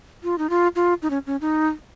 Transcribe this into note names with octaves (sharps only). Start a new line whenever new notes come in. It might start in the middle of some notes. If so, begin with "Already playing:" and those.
F4
D#4
F4
F4
D#4
C#4
C#4
D#4